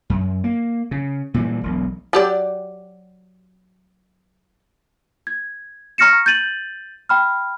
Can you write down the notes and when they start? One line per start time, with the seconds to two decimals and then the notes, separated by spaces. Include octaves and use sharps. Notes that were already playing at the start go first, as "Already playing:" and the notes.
0.10 F#2
0.44 A#3
0.91 C#3
1.34 A#2 E3 G3
1.63 E1 B1
2.13 F#3 G4 D5
5.27 G#6
5.98 A#5 C#6 F6 A#6 C#7 E7
6.26 G6 A6 D#7 F#7
7.09 G5 B5 F6